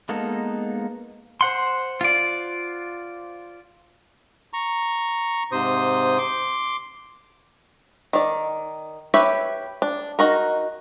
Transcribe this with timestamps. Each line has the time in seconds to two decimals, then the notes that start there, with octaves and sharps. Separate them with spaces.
0.09 G#3 A#3 B3 D#4 A4
1.41 C5 F#5 C6
2.01 F4 D5
4.53 A#5 C#6
5.52 G#2 C3 C5 D#6
6.18 C6 D6
8.13 D#3 D5
9.14 G4 B4 C#5 E5
9.82 D4
10.19 D#4 F#4 A#4